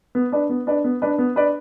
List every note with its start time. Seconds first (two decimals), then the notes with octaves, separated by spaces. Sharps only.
0.15 B3
0.32 D4 B4 D5
0.49 B3
0.67 D4 B4 D5
0.84 B3
1.02 D4 B4 D5
1.18 B3
1.36 D4 B4 D5